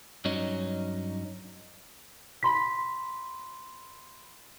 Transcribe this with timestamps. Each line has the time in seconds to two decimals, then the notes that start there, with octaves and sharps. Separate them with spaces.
0.25 G2 F#3 C#4 D#4
2.43 B5 C6 B6